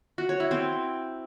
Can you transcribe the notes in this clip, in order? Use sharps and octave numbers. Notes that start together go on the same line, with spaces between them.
F#4
C#5
E4
C4